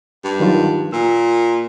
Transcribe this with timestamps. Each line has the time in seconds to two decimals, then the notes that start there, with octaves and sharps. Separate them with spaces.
0.24 G2
0.40 D#3 F#3 F4
0.92 A#2 E6